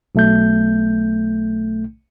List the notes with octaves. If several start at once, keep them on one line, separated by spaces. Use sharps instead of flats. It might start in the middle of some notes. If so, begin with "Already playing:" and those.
B1 A3 G6